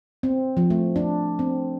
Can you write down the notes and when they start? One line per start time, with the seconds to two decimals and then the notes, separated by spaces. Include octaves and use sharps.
0.23 C4
0.57 F3
0.70 A3
0.96 D4
1.39 C4